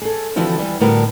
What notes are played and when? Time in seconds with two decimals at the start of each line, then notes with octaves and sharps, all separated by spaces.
0.02 G#4 A4
0.36 D3 E3 F3 C4 E4 F#4
0.58 E3 G3 B3
0.81 A2 D3 G3 B3 F#4 A#4